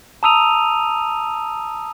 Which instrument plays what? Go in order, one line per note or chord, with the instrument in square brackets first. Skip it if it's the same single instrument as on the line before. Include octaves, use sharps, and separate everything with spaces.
[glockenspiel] A5 A#5 D#6 E6 D#7 F7